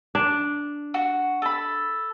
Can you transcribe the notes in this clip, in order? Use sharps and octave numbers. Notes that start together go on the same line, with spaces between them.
D4
F#4
A4 B5